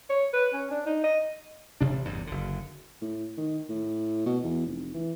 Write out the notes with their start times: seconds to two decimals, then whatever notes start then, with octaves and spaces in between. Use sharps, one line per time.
0.10 C#5
0.33 B4
0.53 C#4
0.71 D4
0.86 D#4
1.04 D#5
1.81 A1 C3 D4
2.07 G1 E2 G2
2.27 F#1 D3
3.01 A2
3.37 D#3
3.69 A2
4.26 B2
4.43 E2
4.66 F1
4.94 E3